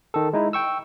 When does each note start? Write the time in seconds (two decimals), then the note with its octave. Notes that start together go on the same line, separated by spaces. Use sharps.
0.14 D#3 A4
0.33 G#3 D#4 E4
0.53 G5 C#6 E6